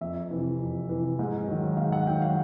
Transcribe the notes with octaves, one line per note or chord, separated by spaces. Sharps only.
F2 E5
C3 E3
F2
C3 E3
G#2
D#3 F#3
G#2 F5
F#5
D#3 F#3 G5
F5